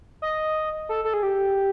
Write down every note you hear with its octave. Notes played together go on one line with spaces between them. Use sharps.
D#5
A4
A4
G#4
G4